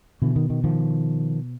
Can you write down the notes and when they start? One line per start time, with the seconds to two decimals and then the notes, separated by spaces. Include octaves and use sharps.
0.22 B2 D3 E3
0.36 D#3
0.50 D#3
0.64 D#3 F3